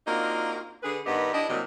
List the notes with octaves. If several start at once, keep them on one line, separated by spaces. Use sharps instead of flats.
A#3 C4 D4 D#4 F4 F#4
D3 G#4 B4
G2 D#3 B3 G4 D#5
D4 E4 G4 D#5
C3 E3 F#3 G3 A#3 D#5